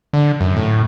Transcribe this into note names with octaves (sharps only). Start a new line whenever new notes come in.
D3
F#2
A2